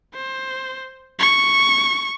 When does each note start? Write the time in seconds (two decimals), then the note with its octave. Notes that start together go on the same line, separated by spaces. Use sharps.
0.15 C5
1.19 C#6